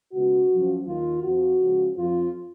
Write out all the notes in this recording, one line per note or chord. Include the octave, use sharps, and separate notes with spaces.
C#2 B2 F#4
F#2 F3
D#2 D#3 F4
F2 F3 F#4
C#2 C#3 F3
F2 F3 F4